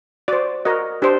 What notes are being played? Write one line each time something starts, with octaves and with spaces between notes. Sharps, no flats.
F#4 C5 D5
F#4 A#4 D#5
D4 G4 C5